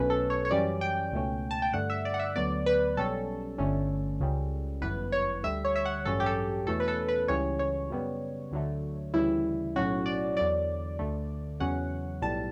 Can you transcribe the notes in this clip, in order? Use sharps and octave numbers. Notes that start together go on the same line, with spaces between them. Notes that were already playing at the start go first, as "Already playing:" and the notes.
Already playing: B1 B2 A3 C#4 B4
A4
C#5
C#5
F#2 E3 G3 C#4 D5
G5
C#2 B2 A3 C#4
A5
G5
G2 D3 A3 F#5
E5
D5
F#5
E5
D2 D3 F#3 B3 D5
B4
B1 B2 G3 C#4 A4
G1 G2 D3 A3 C#4
C#2 C#3 G3 C#4
G1 F#2 E3 B3 B4
C#5
D2 D3 G3 E5
C#5
E5
F#5
A1 G2 F#3 C#4 A4
G4
A4
E2 B2 A3 C#4 A4
B4
A4
B4
C#2 C#3 E3 G3 C#4 C#5
C#5
F#2 C#3 G3 B3
D2 D3 F#3 A3
D2 C#3 E3 G3 E4
B1 A2 F#3 C#4 F#4
D5
E2 D3 F#3 D5
D2 D3 A3
E2 C#3 F#3 C#4 F#5
B1 A2 G3 A5